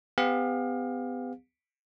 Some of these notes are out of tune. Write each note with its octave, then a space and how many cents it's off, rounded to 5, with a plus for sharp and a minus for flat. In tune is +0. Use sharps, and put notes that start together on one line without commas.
B3 +35 G4 +40 F5 +25